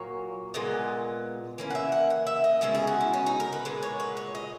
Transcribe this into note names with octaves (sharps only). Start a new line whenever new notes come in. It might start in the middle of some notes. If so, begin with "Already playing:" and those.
Already playing: A#2 F#3 A#3 C#5
A#2 G#3 B3 D#5
E3 A#3 C#4
F#5
E5
F#5
F#5
E5
D#5
B2 G#3 C#4 E5
G#4
F#4
E4
C#4
D#4
A#4
B4
A#2 G#3 B3
C#5
B4
C#5
D#5